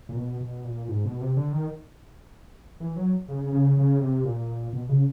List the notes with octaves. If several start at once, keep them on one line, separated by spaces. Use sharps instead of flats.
A#2
B2
B2
A#2
G#2
B2
C3
D3
D#3
E3
F#3
C#3
C#3
C#3
C3
A#2
B2
C#3